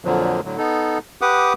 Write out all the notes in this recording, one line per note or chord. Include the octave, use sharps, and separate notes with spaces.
F2 A#2 D3 F3 F#3
A2 D3 F#3
B3 D#4 A4
G4 B4 F#5 D6 D#6